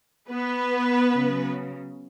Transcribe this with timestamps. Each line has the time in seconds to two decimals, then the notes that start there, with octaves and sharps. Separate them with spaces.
0.31 B3 B4
1.14 C#3 F#3